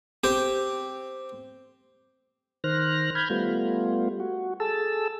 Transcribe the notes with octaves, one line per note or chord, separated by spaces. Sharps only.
C4 G4
D#3 C5 F6 F#6 A#6
B5 F6 G6 G#6
G3 A3 B3 F4
F#4
G#4 A4 A5 E6